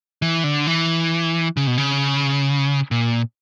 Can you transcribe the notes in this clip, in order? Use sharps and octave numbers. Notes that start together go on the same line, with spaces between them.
E3
D3
E3
C#3
B2
C#3
A#2